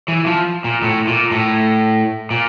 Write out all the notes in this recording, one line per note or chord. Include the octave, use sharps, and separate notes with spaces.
E3
F3
A#2
A2
A#2
A2
A#2